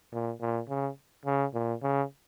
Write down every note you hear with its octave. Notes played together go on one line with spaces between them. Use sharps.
A#2
A#2
C#3
C#3
A#2
C#3